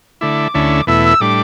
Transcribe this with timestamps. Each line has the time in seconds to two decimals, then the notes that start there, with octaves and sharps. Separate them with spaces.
0.21 D3 A3 E4 D6
0.54 D2 D3 A3 C#4 E4
0.87 E2 B2 A3 E4 E6
1.04 E6
1.21 A2 G3 D4 D6